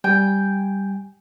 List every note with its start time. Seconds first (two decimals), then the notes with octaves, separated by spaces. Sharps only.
0.04 G3 G5 G#5 G6